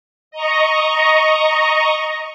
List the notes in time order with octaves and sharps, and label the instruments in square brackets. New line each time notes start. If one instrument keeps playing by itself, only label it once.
[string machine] D#5 A#5 C#6